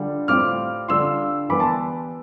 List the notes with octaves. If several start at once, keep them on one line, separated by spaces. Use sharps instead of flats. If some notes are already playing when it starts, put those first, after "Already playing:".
Already playing: D3 G3 D4 F4
A2 G3 C4 F4 D6 F6
D3 G3 D4 F4 C6 E6
E3 G3 B3 B5 D6
A5 C6